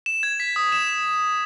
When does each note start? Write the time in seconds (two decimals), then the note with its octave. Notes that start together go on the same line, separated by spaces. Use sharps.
0.06 E7
0.23 G#6
0.40 B6
0.56 D#6
0.72 E7